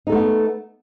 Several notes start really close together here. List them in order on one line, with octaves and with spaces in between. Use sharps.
D#4 A4 A3 B3